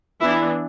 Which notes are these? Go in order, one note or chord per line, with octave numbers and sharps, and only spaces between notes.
E3 B3 D4 E4